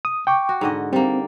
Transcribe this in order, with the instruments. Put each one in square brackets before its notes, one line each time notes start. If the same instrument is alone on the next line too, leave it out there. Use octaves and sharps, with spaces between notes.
[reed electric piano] D#6
G5 C#6 D6
[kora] F#4
G#2 D3 D#5
[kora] G3 A#3 [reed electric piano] C4